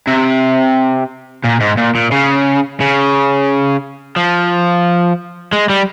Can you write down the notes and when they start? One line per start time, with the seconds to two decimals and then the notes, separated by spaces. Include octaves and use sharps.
0.07 C3
1.44 A#2
1.60 G#2
1.77 A#2
1.95 A#2
2.12 C#3
2.80 C#3
4.16 F3
5.52 G#3
5.70 G3